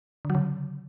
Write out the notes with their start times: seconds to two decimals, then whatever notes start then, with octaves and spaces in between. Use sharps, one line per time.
0.25 D3
0.30 F#3
0.35 C#3